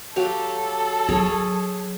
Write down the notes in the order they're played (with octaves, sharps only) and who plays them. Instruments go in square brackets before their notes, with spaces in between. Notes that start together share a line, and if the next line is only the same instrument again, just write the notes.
[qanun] F#3 G4 F5 [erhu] A4
[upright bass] F#3 [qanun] G#4 C#5